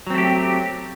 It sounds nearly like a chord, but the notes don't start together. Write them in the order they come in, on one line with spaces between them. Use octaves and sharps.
F#3 C4 A3 G4